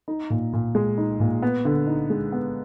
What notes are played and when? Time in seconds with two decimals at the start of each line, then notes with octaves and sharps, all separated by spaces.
0.08 D#4
0.30 A#2
0.53 A#2
0.75 G#3
0.98 D#4
1.20 A#2
1.43 B3
1.65 D3
1.87 D#4
2.10 G#3
2.32 B3